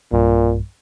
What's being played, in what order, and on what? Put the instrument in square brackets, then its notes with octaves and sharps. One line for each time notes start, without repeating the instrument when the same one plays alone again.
[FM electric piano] B1 G2 [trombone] A#2